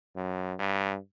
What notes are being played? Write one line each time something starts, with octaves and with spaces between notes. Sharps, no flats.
F#2
G2